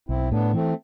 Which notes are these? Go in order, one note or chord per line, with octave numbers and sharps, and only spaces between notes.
B1 C4 E4
A2 B3 D4
E3 A3 C4